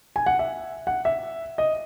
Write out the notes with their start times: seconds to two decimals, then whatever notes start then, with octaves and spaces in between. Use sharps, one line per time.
0.16 G#5
0.26 F#5
0.39 E5
0.87 F#5
1.05 E5
1.58 D#5